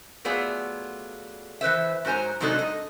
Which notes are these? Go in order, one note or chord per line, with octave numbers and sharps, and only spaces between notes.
F#3 A3 B3 F4 G#4 D5
E3 B4 C5 E5
G#2 F#3 C5 G#5 A#5
C3 F#3 G#3 D4 D#4 A4
D#5